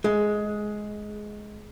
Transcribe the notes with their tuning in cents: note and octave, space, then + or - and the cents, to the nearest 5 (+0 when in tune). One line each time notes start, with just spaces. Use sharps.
G#3 +15